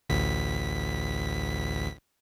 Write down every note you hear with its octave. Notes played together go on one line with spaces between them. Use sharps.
A1 D2 B6